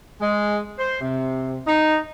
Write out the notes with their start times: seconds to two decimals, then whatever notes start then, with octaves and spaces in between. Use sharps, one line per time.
0.20 G#3
0.78 C5
1.01 C3
1.66 D#4